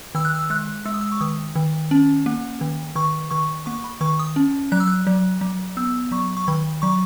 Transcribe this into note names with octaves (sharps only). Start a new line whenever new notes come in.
D#3 E6
F#6
E6
G#3 F#6
G#3 E6
D#6
E6
C#6
D#3 D#6
D#3
C#4
A#3
D#3
D#3 C#6
D#3 C#6
A#3 C#6
B5
D#3 C#6
D#6
C#4
F#3 F#6
E6
F#6
F#3
F#3
B3 E6
F#3 C#6
C#6
D#3 B5
F#3 C#6